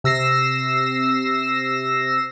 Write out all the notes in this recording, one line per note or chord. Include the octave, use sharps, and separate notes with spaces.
C3 E6 A#6 C7 E7